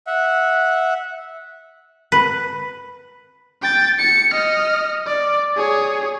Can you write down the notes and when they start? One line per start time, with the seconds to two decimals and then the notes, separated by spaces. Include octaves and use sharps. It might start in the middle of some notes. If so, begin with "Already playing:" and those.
0.07 E5 F#5
2.12 B4
3.62 G5 A6
3.99 C#7
4.33 D#5 F6
5.06 D5
5.57 G#4 C#5